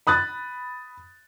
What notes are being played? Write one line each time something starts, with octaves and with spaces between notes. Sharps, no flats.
B5 D#6 F#6 A6